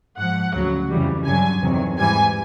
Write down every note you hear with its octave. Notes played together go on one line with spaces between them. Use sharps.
G#2 F3 F#5
D2 C#3 F#3
F2 C#3 E3 G3
G2 D3 F#3 G#5
E2 C3 D#3 F#3
G#2 E3 G3 G#5